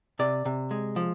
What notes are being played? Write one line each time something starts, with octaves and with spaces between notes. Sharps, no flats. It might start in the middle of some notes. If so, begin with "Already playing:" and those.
C3 D5
C3
G#3
F3